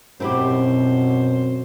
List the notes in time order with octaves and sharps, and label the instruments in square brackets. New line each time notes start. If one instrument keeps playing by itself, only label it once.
[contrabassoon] F#2 [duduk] B2 [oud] C4 E4 G4 [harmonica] C5